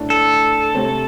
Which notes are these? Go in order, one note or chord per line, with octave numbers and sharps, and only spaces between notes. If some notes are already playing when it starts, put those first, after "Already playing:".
Already playing: A2 A3 D4
A4
C3 A3 C4